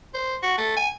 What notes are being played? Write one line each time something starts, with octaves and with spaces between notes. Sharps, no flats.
C5
F#4
A3
G#5